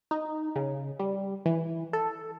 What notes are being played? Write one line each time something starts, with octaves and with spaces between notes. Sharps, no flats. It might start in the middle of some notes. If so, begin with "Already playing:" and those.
D#4
C#3
G3
E3
A4